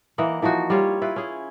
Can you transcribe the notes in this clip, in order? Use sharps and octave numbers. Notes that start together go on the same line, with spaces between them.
E3 A#3 D#5 F#5
E3 F3 D#4 F#4
G3 F4 C#5
E4 F4 B4
C#4 G#4